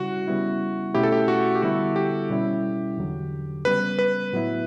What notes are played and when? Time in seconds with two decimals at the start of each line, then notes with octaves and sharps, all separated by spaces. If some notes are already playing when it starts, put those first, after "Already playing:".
Already playing: C#3 G3 C#4 E4 F#4
0.28 C#3 G3 B3 E4
0.94 B2 A3 C#4 E4 G4
1.03 A4
1.12 G4
1.28 F#4
1.55 G4
1.62 D3 G3 B3 E4 F#4
1.96 G4
2.30 B2 G3 C#4 E4
2.97 E2 D3 F#3
3.65 C#3 G3 B3 B4
3.99 B4
4.32 A2 F#3 B3 E4